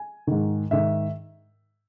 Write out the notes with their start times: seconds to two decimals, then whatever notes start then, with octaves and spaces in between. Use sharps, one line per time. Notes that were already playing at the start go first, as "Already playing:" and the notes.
Already playing: G#5
0.27 G#2 D#3
0.71 G#2 D#3 E5